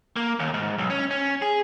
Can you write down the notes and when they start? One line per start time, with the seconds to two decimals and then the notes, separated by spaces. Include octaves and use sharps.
0.16 A#3
0.40 D#2
0.54 G#2
0.78 B1
0.90 C#4
1.11 C#4
1.42 G#4